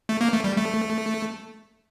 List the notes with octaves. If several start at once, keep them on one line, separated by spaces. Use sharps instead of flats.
A3
A#3
A3
G3
A3